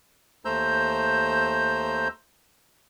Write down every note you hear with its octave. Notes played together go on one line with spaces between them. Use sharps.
D#2 A3 C5 A#5 E6 G6